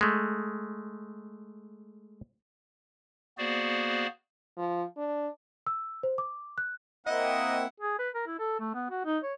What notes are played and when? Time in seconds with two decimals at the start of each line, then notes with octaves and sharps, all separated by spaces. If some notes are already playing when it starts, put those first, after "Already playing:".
0.01 G#3 A3
3.38 A#3 B3 F#4 G#4 C5 D5
4.57 F3
4.97 D4
5.67 E6
6.03 C5
6.18 D6
6.58 F#6
7.06 A#3 C4 E4 D#5 F#5
7.80 G#4
7.99 B4
8.15 A#4
8.27 E4
8.39 A4
8.60 A3
8.74 B3
8.90 F#4
9.05 D#4
9.23 C#5